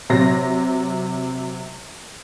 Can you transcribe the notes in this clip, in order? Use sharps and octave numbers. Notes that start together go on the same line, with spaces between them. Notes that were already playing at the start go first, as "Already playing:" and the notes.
C3 F#3 A#6